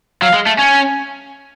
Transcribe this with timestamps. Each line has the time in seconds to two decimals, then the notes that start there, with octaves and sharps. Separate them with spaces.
0.22 F#3 F5
0.34 G#3
0.46 A3
0.58 C#4 G#5